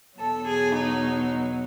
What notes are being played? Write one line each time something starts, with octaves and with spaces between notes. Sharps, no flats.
E2 B2 F#3 A4
G#4
D#4